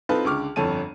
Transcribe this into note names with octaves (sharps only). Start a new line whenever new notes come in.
C4 D#4 F4 A4 B4
C#2 D3 C#6 D6 F6
G1 F2 A4 C#5 A5 D#7